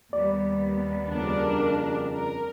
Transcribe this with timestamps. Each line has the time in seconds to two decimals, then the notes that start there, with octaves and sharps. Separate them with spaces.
0.13 D#2 G3 B3 D5
1.10 F2 C#3 D4 A#4
2.13 A#4